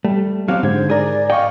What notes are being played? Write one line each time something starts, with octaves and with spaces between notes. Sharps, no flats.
G3 A3
F#3 C4 G4 F5
G#2 D3 C5 G#6
G#4 A#4 D5
D5 D#5 F5 G5 C#6